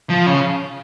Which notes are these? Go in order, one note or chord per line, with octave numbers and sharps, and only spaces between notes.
F3
C#3